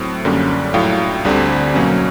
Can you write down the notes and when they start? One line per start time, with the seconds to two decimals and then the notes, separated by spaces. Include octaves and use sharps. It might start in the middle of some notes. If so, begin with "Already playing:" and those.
Already playing: A2 F#3 A3 C4
0.25 F#2 D3 G3 A#3 C#4
0.74 A#1 A2 F#3 F5 G5
1.25 D2 D3 G3 C4
1.74 B1 B2 F#3 A#3 C#4